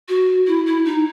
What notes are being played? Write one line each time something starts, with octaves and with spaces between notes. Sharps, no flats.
F#4
E4
E4
D#4